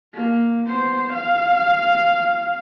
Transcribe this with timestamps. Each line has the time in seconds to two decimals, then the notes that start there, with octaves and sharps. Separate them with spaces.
0.14 A#3
0.67 B3 C5
1.13 F5